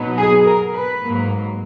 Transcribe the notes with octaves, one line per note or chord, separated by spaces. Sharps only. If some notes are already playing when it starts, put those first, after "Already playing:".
Already playing: B2 F#3 B3 D#4
G#4
A#4
B4
G#2 F#3 A#3